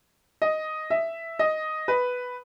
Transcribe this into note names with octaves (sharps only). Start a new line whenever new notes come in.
D#5
E5
D#5
B4